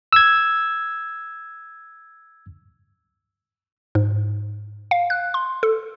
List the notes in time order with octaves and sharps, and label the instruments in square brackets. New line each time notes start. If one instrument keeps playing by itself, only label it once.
[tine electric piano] E6 G#6
[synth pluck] G#2
F5
F#6
C6
A4